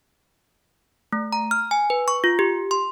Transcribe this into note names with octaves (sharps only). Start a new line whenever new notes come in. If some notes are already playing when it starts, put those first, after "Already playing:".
A3
A#5
F6
G#5
B4
C#6
F4
G4
C6